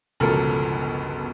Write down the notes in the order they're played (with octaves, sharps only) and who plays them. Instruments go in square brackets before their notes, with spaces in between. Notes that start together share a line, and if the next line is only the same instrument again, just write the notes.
[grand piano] G1 C#2 B2 F3 A4 A#4